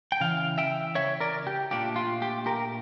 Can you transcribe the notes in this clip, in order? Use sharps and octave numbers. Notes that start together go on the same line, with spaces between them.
G5
C#3 E3 F5
E5 G5
C#5 E5
A#4 D5
G4
A#2 A3 D4 F4 G4
F4
G4
G4 A#4